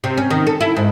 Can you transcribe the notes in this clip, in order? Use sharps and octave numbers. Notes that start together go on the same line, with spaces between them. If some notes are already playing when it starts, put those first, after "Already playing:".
C3
C#4
D#3
A4
E4
G#2